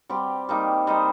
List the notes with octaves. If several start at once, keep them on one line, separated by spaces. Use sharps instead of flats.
G3 C4 G4
G3 A#3 D#4
G3 D#4 C5 D#5